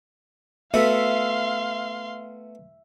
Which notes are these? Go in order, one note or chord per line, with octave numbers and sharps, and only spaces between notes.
A3 B3 F#4 E5 F5 C6